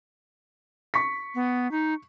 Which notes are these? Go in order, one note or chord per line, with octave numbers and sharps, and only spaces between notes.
C#6 B6
B3
D#4